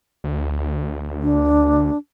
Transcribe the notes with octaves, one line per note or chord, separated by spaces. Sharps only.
D2
D4